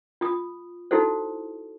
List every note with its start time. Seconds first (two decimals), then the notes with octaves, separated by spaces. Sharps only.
0.21 F4 D#6
0.91 D#4 E4 F#4 A4 C5